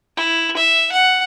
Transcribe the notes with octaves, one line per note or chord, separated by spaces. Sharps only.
E4
E5
F#5